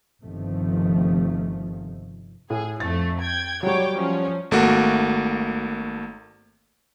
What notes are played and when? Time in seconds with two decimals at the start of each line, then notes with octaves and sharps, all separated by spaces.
0.22 G1 C3 D#3 F3 A3
2.50 A2 G#4
2.80 F2 A3 A6
3.21 G5 G#6
3.63 F#3 G3 C#5 G5 D6
3.96 F3 C#4
4.51 G#1 A3 A#3 F#4